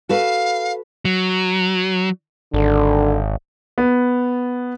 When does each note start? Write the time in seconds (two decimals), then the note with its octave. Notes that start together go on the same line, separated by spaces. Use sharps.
0.09 F#4 A4 B4 F5
1.05 F#3
2.54 G#1 D3
3.78 B3